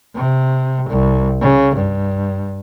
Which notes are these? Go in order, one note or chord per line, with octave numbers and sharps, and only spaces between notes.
C3
C2
C#3
G2